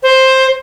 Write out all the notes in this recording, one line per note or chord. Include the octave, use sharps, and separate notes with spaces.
C5